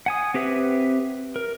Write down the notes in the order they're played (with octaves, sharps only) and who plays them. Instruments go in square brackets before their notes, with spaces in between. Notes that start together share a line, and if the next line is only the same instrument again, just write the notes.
[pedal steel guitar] F#5 G#5 D#6
C4 G4 B4 E5
A#4